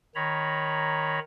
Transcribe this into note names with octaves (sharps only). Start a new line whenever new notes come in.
D#3 C#5 A#5 B5